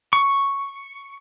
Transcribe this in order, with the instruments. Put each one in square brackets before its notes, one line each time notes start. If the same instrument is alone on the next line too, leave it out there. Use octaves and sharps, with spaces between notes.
[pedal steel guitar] C#6